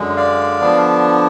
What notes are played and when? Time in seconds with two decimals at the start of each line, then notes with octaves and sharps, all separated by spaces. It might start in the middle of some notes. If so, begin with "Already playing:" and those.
Already playing: F#2 D3 G#3
0.17 D5 F5
0.60 D3 F3 B3 D4